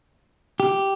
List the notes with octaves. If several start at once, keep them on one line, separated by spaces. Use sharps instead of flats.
G4